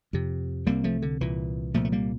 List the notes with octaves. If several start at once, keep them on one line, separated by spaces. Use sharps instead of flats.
F2 C3
C2 C3 G3 A#3
F3 A3
D3
C2 A#2 E3
C2 A#2 F3 A3
A3
G3 A#3